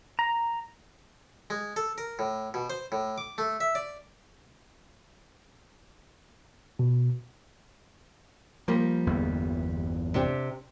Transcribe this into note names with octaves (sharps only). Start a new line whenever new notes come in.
A#5
G#3
A4
A#4
A2
B2
C5
A2
D6
A3
E5
D5
B2
F3 G3 A#3
G1 E2 B3
C3 D4 G4